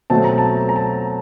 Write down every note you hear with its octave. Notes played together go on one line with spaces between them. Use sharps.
B2 F#3 A3 C4 A5
A#5
A5
A#5
A5